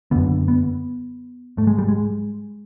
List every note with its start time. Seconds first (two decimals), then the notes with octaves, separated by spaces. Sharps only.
0.11 F#2 D3 B3
0.48 B3
1.57 G#2 A3
1.67 G#3
1.78 G3
1.88 G#3